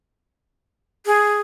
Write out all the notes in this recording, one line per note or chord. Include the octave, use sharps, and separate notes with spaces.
G#4